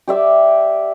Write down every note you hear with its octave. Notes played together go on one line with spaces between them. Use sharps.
G4 D5 E5